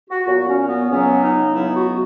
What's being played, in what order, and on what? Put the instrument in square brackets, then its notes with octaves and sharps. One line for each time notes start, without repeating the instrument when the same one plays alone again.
[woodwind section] F#4
A#2 F#3 B3 F#4
C#4
B3
C#2 C#3 F#3 B3 C#4
D#4
C#2 C#3 F#3 B3 E4
F#4